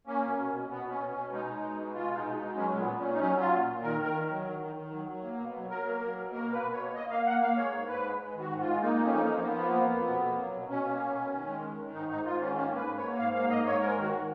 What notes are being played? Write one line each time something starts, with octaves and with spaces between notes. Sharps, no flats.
A#3 C#4
B2
B2
B2
B2 B3
B2 C#4
B2
C#4
B2
G#3 D#4
G#3
B2
G#3
G#3 F4
B2
D#4
B2
G#3 D#4
F#3 C#4
A#2
B3
A#2
F#3 C#4
D#4
F#3 C#4
F#3
F4
A#2
A#2
D#3 A#4
D#3
A#4
D#3
F#3
D#3
D#3
D#3
F#3
F#3
A#3
B2
F#3
F#3 A#4
A#3
F#3
B2
A#3 A#4
B2 B4
B2
C#5
A#3
A#3 D#5
A#3 F5
A#3 F#5
A#3 F5
G#3 C#5
G#2
G#2 B4
G#3
G#3
D#3 F#4
G#2
F4
G#3
A#3 D#4
F2
C#4
A#3 D#4
F3
F3 B3
A#3
F2
F2
B2
A#3
F#3
B2
B2 C#4
A#3
B2
B2
D#3
G#3
D#3
D#3
G#2 D#4
G#2 D#4
G#2 F4
D#3 C#4
A#3 C#4
G#2 B4
G#2
C#5
A#3
G#2 F5
A#3 F5
G#2 D#5
G#2 C#5
G#3 A#4
D#3
F#4
D#3